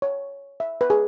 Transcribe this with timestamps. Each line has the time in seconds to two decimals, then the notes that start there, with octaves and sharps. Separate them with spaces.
0.02 C#5
0.60 E5
0.81 B4
0.90 G#4